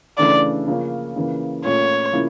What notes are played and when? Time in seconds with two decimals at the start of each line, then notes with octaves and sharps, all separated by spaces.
0.18 C#3 E3 A3 D4 D5
0.67 C#3 F3 A#3 C#4
1.16 C#3 E3 A#3
1.64 A#2 A3 C#4 C#5
2.13 C#3 F3 A#3 E4